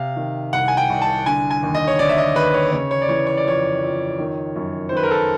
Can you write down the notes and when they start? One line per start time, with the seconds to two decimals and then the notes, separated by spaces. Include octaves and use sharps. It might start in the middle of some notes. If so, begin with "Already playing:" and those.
Already playing: C3 F5
0.16 D#3
0.53 C2 F#5
0.68 G#5
0.77 G5
0.90 C2
1.02 A5
1.26 D3 G#5
1.51 G#5
1.63 D#2
1.75 D#5
1.87 C#5
1.99 D3 D5
2.09 E5
2.18 D#5
2.35 D#2 B4
2.54 C#5
2.72 C#3 C#5
2.91 C#5
3.02 D5
3.09 E3 C#5
3.27 C#5
3.37 D5
3.46 F2 C#5
3.82 F2
4.19 D#3
4.55 F#2
4.89 C5
4.92 D#3 B4
5.03 A#4
5.11 A4